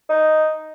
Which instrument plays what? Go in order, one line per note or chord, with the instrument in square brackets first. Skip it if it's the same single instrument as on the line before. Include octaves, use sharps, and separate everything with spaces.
[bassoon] D#4